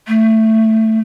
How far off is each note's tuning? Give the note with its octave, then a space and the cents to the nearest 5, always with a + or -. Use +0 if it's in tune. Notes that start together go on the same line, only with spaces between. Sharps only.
A3 +10